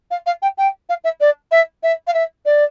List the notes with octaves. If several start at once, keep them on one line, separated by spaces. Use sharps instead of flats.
F5
F5
G5
G5
F5
E5
D5
E5
E5
F5
E5
D5